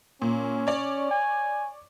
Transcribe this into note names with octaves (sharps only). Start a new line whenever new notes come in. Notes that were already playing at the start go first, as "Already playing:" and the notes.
A#2 C#4
C#5 D5
G#5